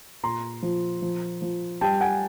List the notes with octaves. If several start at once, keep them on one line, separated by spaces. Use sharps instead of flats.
A#2 A#5 C6
F3
F3
F3
G3 G5 A5
F#5 G#5